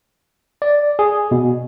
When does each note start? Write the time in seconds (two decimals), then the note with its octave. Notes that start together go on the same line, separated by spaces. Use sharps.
0.62 D5
0.99 G#4
1.31 B2